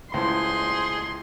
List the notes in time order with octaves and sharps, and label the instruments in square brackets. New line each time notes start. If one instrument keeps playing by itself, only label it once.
[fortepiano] C#2 A2 [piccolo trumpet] G#4 [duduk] C5 [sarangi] C6